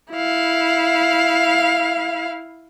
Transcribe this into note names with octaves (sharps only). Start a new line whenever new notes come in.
E4 F5